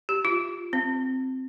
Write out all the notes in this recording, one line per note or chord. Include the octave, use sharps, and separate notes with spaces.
G4
F4
C4